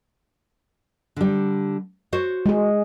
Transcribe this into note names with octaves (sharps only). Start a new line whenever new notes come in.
D3 G3
F#4 C5 C#5
G#3 G#4